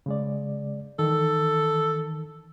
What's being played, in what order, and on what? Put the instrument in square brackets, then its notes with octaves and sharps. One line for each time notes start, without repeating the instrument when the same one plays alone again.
[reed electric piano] C#3 G#3 D5
[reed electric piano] D#3 E3 [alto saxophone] A4